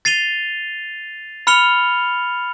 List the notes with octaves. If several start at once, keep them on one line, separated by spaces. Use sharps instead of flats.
A6 C7 D#7 F7 G7
B5 F6 C#7 F7 G7